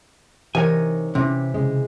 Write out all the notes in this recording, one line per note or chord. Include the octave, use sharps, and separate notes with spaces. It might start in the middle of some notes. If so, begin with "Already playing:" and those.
C3 E3 D#4 A#4 C#5 G#5
C3 E3 C#4 G4
C#3 G#3 C#4